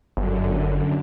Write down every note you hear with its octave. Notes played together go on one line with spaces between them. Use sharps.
G1 F#2 D3